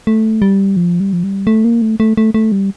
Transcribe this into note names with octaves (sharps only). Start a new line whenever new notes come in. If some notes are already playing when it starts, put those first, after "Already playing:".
A3
G3
F3
G3
F3
G3
A3
A#3
A3
A3
A3
A3
G3